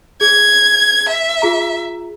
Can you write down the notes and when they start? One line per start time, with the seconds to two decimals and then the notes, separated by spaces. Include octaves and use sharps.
0.21 G#4 G#6
1.09 E5
1.42 F4 G#4 A#5